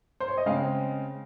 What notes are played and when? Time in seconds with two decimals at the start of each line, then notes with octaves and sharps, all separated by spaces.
0.20 C5
0.28 C#5
0.37 D#5
0.46 C#3 G#3 C4 F5